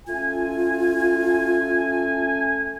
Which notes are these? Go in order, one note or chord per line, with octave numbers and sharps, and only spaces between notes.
A3 C#4 F4 G#5